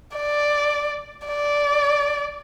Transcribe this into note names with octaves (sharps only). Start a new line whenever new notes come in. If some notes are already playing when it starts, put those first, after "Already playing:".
D5
D5